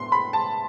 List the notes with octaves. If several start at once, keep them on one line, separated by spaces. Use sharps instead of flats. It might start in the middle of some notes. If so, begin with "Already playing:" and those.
Already playing: A2 B3 C6
B5
A5